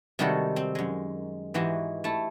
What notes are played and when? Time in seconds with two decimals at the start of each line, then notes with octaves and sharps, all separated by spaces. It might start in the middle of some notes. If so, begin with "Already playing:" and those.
0.19 C3 D#3 G3 G#3 F#4 A4
0.56 C4
0.75 F#2 G#3
1.54 G#2 E3 G#3 F#4 G4
2.04 A3 E4 A5